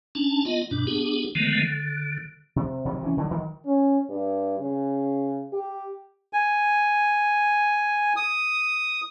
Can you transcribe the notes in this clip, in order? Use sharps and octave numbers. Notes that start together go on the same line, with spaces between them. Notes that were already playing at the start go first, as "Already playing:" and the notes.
C#4 D4 A5
B3 F4 D#5
G2 B2 D4
B3 D4 G4 G#4
D3 D#3 F3 G#3 A3 B3
D3
C3
C3 D#3 F#3
E3 C#4
D3 D#3 F3 F#3
D#3
C#4
G2
C#3
G4
G#5
D#6